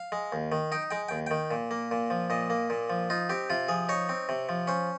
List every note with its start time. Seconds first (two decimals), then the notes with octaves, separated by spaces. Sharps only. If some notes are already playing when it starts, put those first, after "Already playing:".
Already playing: F5
0.12 G#3
0.32 D#2
0.52 D#3
0.72 D#4 G5
0.91 G#3 G5
1.08 D#2 G5
1.26 D#3 G5
1.51 A#2
1.71 A#3
1.91 A#2
2.10 F3
2.30 A#2 D#5
2.50 A#3
2.70 A#2
2.90 F3
3.10 D#4 F4
3.29 C4 G4
3.50 C3 F4
3.68 F3 G#4
3.89 D#4 C#5
4.09 C4
4.29 C3
4.49 F3
4.67 C#4 C5